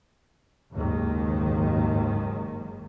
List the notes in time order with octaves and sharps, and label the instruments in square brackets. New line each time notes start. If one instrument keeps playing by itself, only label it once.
[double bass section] F#1 D#2 G#2 D#3